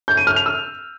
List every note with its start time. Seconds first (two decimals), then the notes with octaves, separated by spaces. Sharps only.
0.08 G6
0.17 D#7
0.27 F6
0.36 F7
0.46 E6